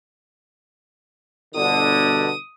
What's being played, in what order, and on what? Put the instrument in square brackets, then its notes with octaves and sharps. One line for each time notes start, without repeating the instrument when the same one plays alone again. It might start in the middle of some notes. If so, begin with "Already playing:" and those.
[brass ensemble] G1 B2 D3 [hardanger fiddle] D#6